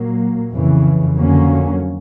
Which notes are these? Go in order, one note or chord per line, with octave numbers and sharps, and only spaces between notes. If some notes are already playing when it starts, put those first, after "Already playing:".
Already playing: A#2 F#3 A#3
F2 C#3 E3
F2 D3 F#3 A#3 C#4